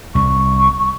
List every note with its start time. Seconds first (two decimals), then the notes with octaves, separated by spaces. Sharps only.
0.15 C2 C#6